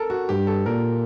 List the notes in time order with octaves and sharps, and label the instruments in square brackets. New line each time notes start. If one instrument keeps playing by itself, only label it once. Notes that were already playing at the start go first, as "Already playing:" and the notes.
Already playing: [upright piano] A4 A#4
F#4
[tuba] G2 [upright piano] G4
[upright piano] A4
[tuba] A#2 [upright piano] A#4